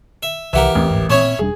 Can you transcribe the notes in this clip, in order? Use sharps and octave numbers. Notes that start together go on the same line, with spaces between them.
E5
C2 E3 G4 A#4 E5 F#5
A1 D#2 A3 C4
D1 G1 G#2
A#2 C4 C#4 E4 C#5
E1 G3 D4 G#4